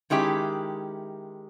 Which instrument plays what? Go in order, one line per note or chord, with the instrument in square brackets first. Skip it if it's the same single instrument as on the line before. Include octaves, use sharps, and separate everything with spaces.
[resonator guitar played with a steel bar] D#3 G#3 C#4 E4 G4